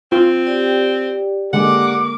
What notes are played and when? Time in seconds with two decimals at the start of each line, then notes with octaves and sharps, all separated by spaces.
0.12 C4 F4
0.46 G4 D5 G5
1.53 D3 G#3 A#3 F#5 D6